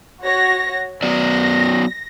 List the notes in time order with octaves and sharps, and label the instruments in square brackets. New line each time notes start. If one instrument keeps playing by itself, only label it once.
[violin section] F#4 C#5 A#6
[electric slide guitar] F#3 B3 D5 [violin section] A#6